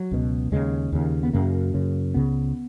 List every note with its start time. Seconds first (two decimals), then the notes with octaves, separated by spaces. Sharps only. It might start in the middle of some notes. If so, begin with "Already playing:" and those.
Already playing: F#3
0.11 C#2 B2
0.52 D#2 C#3 G#3
0.92 D#2 C#3
1.23 B3
1.33 F#2 C#3 A#3
1.74 F#2 C#3
2.14 C#2 C#3 B3